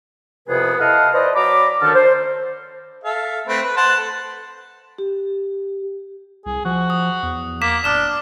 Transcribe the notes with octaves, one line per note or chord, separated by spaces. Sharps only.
C2 F2 C3 B3 G#4 B4
E4 A4 D#5 F5 F#5 A5
B4 C5 D5 D#5
F#3 D5 A#5 B5 D6
F#2 D3 D#3 A3 A5 F6
C5
A4 E5 F5
A3 C4 B4
B4
C5 F#5 A5
A4
G4
C2 G#4
F3 F#4
D#6
E2
A#3 D6 B6 E7
D1 D4 D6 F6 E7